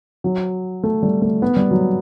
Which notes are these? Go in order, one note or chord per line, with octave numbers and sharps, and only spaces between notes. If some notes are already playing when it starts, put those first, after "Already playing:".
F#3
A3
G3
A3
B3
G3
F#3